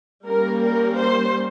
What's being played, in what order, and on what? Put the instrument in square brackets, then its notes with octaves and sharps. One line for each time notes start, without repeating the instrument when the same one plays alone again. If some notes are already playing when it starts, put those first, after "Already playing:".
[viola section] G3 A#3 C#4 A#4
A#4
C5